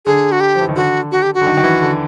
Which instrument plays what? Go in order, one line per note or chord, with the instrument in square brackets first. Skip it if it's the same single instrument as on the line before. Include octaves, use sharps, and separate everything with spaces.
[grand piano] D3 [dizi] G#4
[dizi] F#4
G4
[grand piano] F3
E3
D#3
[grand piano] D3 [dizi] F#4
[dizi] F#4
G4
F#4
[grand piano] D3
D#3
D#3
E3
D3